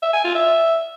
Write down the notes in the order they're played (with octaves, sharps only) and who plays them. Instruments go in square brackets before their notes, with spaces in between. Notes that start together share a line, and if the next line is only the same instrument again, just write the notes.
[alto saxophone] E5
G#5
F4
E5